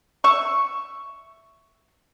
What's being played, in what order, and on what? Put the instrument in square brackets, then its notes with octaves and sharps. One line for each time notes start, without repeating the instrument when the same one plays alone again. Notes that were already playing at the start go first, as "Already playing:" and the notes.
[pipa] E5 C#6